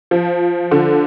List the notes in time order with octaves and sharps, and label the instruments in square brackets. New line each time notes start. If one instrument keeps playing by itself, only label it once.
[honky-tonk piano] F3
D3